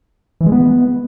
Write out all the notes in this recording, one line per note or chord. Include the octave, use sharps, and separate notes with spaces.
E3
G#3
B3